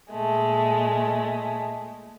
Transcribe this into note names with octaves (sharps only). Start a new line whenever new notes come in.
A#2 G#3 A3